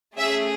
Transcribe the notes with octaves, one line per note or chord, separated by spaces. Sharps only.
A3 C#4 G#4 E5